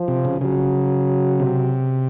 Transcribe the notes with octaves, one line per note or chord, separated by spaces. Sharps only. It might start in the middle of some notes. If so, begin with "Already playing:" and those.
Already playing: F3
C3
C#3
C#3 F#3
C3